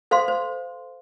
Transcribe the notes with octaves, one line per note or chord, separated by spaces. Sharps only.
A4 C5 F5 C6
C5